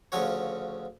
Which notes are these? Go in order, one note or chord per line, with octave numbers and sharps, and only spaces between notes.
D2 C#3 F3 F#4 C#5